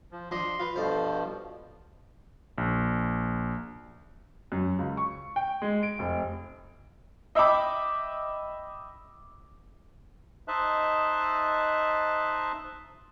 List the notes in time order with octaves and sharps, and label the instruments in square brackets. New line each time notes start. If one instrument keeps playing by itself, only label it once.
[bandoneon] F3
[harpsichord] F3 D4 D#5 [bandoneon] C6
[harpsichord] F4 B4
[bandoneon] G2 B2 F3 [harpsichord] A4 C5
[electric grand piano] A#1
[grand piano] F#2
C#2
C#6
G5
G#3
D7
F1
[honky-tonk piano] D#5 E5 G5 B5 D6 E6
[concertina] D#4 C5 D#5 E5 A5 F#6